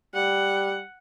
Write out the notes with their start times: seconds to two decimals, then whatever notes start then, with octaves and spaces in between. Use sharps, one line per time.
0.15 G3 F#5